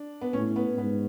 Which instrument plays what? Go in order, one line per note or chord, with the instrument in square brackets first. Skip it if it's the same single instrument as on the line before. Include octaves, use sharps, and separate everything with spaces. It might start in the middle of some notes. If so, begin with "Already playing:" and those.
Already playing: [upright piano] D4
B3
[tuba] A2 [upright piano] C#4
[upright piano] B3
[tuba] G#2 [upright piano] B3